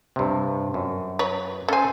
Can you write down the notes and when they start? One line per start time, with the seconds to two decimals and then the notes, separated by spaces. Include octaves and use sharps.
0.16 G2 C3
0.74 F#2
1.19 B4 C#5
1.68 C#4 A4 C5 G#5